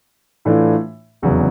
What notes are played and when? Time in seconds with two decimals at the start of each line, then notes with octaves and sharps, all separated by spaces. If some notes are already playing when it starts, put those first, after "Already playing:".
0.45 A2 E3 A3 D4 F4
1.22 F1 E2 C#3 F#3